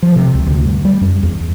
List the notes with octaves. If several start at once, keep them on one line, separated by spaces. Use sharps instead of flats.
F3
C3
C#2
D2
G2
G3
F#2
E2